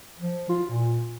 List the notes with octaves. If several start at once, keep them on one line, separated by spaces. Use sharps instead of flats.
F3
F4
A#2